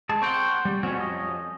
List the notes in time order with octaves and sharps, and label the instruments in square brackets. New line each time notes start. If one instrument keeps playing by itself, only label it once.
[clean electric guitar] G#3 [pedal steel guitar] G#4 A5
[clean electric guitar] C4 C5 G5 [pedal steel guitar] F#5 C#6
[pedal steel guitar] G3
[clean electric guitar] F2 C#4 [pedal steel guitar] C4 F#4 C#5
[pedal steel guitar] D#5